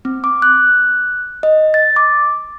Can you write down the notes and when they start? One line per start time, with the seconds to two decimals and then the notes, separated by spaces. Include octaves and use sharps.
0.05 C4
0.24 D6
0.42 F#6
1.43 D#5
1.74 A6
1.96 D6